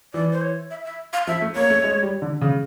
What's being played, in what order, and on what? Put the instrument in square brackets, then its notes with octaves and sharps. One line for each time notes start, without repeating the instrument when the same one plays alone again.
[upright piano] E3 [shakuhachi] D5
[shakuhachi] C5
C#5
E5
E5
F5
[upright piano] F3 [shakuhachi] E5
[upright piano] A3
[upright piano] A#3 [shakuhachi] C#5
[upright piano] A3
G#3
G3
D3
C#3